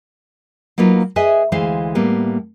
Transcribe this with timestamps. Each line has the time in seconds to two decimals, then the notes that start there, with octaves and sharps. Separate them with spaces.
0.78 F#3 A#3 D#4 F4 B4
1.16 G#4 B4 D#5 E5 G#5
1.52 D2 E3 G#3 C5 F5
1.95 A2 G3 A#3 B3